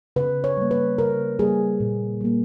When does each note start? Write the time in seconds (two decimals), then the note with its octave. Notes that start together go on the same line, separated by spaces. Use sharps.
0.16 C#3 B4
0.44 C#5
0.57 G3 A#3
0.71 B4
0.98 C#3 A#4
1.39 G3 A#3 G#4
1.80 A#2
2.21 G3 A#3